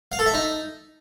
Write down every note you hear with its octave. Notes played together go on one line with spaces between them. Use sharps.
F5
A4
E5
D#4